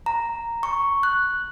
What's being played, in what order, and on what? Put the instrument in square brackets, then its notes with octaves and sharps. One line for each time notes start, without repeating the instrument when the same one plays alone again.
[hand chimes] A#5
C#6
F#6